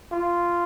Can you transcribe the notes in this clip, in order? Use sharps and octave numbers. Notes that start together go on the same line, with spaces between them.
F4